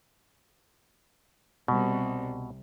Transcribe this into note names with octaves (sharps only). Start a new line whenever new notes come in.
C2 B2